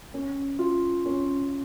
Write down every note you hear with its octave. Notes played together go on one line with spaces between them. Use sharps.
C#4
F4
C#4